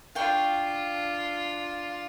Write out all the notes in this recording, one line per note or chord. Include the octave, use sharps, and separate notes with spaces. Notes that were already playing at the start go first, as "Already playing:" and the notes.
D4 F4 F5 G5 C#6